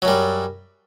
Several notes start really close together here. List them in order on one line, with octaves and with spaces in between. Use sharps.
F#3 F#2 G3